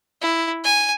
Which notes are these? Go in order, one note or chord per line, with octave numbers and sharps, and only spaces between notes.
E4
G#5